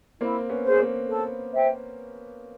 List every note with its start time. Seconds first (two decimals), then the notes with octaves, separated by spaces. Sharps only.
0.20 A#3 C4 E4
0.49 B3 C#4
0.64 G#4 C5
0.80 A#3 C4
1.08 A4
1.52 C5 E5 G5